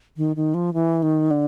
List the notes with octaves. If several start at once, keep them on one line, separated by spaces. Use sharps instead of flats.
D#3
D#3
F3
E3
D#3
D3